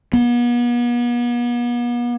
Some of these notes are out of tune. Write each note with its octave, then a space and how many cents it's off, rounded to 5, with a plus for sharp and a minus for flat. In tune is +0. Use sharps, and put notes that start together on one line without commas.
B3 -40